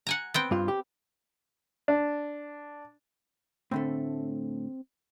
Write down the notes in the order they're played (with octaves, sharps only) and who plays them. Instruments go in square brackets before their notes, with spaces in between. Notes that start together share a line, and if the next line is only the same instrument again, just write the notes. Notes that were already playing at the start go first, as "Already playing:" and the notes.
[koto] F#5 G#5 A#5
B3 C4 G5
[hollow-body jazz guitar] G2 F4
G4
[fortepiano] D4
[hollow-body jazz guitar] A2 D3 A3 [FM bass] C4